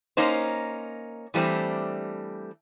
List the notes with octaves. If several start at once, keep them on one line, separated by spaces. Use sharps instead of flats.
A#3 C#4 D#4 C5
E3 G3 A3 C4 D4